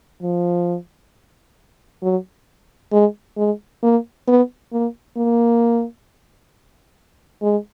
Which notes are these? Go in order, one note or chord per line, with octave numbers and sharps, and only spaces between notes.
F3
F#3
G#3
G#3
A#3
B3
A#3
A#3
G#3